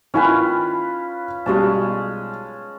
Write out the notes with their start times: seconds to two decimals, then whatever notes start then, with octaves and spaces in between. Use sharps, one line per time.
0.14 D#3 C#4 E4 F4 B4 G#5
1.46 B1 G3 G#3 C#4 A5